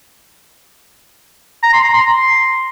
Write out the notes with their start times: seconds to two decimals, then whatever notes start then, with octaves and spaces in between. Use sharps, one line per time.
1.63 A#5
1.73 C6
1.83 A#5
1.94 C6